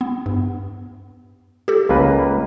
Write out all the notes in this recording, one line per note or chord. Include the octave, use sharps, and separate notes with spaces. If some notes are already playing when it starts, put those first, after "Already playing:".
B3
G2
G4 A4
C#2 A#3 B4